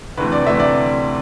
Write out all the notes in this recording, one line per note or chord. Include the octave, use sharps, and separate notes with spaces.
D2 C3 E3 A3 B4
D5
D2 C3 E3 A3 E5
D5